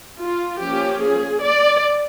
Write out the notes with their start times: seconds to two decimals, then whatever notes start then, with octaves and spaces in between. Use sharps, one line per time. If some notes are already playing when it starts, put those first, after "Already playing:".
0.20 F4
0.60 F3 A#3 C#4 G4
1.01 G#4
1.41 D5